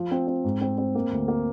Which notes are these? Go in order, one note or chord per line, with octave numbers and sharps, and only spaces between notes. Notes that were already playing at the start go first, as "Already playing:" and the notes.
Already playing: F3
C4
C4
G#2
C4
C4
A#3
D2
A#3